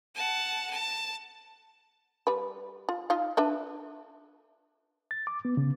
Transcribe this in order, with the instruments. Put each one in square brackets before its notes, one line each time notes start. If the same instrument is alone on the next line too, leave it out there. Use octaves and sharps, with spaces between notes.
[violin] F#5 A5
A5
[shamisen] G3 B4
F4
D#4 F4 F5
D4 B4 E5
[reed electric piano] A6
D6
B3
C#3